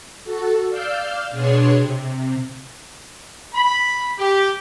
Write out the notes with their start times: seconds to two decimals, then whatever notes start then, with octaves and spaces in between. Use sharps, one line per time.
0.23 F#4 A4
0.70 D5 F5 E6 F6 G6
1.31 B2 D4 G#4 C#5 C6
1.78 C3
3.55 B5
4.19 G4